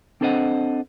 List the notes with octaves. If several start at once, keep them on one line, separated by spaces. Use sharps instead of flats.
C4 D4 A4 C5 D#5 F#5